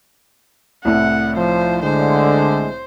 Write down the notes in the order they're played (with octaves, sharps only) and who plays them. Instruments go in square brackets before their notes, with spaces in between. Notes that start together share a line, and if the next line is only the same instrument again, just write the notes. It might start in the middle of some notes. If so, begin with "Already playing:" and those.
[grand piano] C2 A2 A3 [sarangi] F#5
[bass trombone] F3 [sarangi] C5
[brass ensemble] D3 [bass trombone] G#3 [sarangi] C5